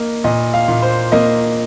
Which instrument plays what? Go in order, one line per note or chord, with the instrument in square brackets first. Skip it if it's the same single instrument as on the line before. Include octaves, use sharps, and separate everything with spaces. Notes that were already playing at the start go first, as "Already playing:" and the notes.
Already playing: [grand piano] A#3 D#4
A#2 D#5
F5
A#2
C5
A#3 D#5